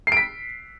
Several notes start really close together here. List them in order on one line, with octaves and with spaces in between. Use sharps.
C7 D7 B6